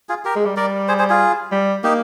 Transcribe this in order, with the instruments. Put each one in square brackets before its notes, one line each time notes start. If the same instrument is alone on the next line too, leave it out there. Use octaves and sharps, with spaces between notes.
[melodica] F4 G#4
G4 A#4
[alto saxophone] G#3
G3
[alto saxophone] G3 [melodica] A#4 D5
[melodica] G#4 C5
G#4 C5
F4 G#4
[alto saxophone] G3
[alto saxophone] A#3 [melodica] D#4 G4